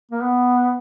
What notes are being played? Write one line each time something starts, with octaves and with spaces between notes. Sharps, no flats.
A#3
B3